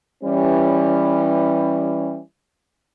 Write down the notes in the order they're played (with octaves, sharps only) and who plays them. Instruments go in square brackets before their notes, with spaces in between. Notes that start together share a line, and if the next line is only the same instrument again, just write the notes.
[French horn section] E3 G3 C#4